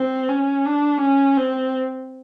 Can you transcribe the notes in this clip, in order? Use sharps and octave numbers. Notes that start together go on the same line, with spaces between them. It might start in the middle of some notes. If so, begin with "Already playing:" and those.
Already playing: C4
C#4
D4
C#4
C4